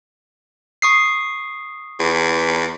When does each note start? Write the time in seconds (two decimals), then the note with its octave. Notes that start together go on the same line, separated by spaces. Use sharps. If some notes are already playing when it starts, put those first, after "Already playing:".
0.82 C#6 D#6 C7
2.00 E2